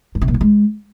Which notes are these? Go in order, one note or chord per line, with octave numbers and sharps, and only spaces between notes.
G2
C3
A#2
F3
G#3